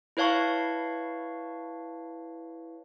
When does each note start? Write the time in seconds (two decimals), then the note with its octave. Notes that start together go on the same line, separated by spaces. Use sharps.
0.17 E4 B4 C#5 F5 A5 C#6